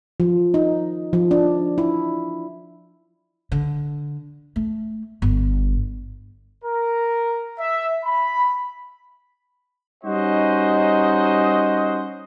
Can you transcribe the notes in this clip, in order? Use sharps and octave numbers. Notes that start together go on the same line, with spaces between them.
F3
D#4
F3
D4
E4
D3
A3
G1
A#4
E5
B5
G3 C#4 D#4 F#4 C5 D#5